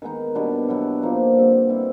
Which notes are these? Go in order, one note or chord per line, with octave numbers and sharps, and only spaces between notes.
D#3 G#3 B3 D#4
B2 G3 B3 D4
B2 F#3 B3 E4
A#2 F3 A#3 D#4
D3 G3 C4
B2 G3 C4 E4